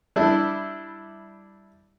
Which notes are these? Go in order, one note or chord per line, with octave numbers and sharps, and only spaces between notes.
G3 D4 E4